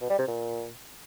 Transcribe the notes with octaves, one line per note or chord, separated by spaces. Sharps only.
B2
G3
C3
A#2